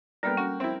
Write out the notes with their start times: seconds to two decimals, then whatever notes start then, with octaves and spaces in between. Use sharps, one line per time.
0.23 G3 A#3 B3 D4 A4 A#4 G5
0.37 C#4 F#4
0.60 C4 E4 E5